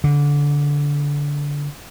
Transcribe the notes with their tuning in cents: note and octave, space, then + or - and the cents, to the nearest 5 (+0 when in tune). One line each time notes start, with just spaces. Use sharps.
D3 -20